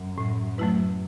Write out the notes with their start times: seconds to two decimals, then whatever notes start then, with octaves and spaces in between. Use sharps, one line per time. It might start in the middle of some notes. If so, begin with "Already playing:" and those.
Already playing: F#2
0.18 A2
0.58 F#3 A3 E4 B4